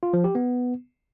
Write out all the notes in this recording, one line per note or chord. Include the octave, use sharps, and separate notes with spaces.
F4
F3
G4
B3